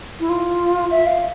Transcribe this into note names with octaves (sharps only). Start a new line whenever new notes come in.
E4
F4
E5
F5